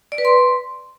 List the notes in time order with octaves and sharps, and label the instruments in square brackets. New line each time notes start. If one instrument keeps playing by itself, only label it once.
[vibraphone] D5
B4
C6